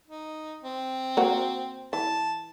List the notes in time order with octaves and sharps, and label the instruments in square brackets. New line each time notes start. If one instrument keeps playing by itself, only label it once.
[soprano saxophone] D#4
C4
[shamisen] A#3 F#4
[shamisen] E3 [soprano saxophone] A5